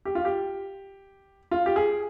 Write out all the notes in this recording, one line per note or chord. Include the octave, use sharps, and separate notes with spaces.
G4
F4
G4
F4
G4
G#4